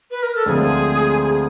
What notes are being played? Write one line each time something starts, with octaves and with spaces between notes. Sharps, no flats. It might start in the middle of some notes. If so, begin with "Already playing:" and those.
B4
A#4
A4
D2 D3 F3 G#3 C4 G#4
G#4